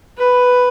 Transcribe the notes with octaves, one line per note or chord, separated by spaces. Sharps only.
B4